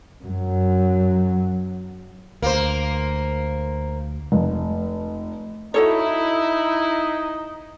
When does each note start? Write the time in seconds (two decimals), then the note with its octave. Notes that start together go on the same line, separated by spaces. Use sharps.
0.24 F#2 F#3
2.42 D2 A#3 C5
4.32 F1
5.74 D#4 E4 F#4 A4 C#5